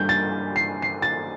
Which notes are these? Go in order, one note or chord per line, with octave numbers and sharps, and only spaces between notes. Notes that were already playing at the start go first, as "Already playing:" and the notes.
Already playing: G2 G3 G6
A6
C7
C7
A6